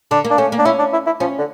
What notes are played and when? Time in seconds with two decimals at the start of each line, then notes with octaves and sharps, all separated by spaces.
0.11 D3 D4
0.24 A#3
0.31 D4
0.38 A3 C#4
0.52 A#3
0.59 D4
0.65 C#4 E4
0.79 D4
0.93 E4
1.07 E4
1.20 F3 C#4
1.39 D3